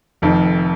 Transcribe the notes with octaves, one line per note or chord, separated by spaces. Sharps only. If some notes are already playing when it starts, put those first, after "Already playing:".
F1 F2 D#3